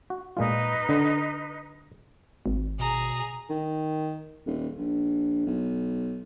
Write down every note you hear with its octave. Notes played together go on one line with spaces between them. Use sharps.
F#4
A#2 G#3 D#4 F4 B4
D3
G#1
B2 G#4 A#5
D#3
D#1
A#1
B1